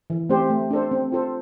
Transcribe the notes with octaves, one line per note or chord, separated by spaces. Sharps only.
E3
A3 C4 G4 C5
A3
D4 A4 C5
C4
F4 A4 C5